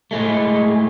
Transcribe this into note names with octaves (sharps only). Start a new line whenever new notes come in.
A2 G#3 A3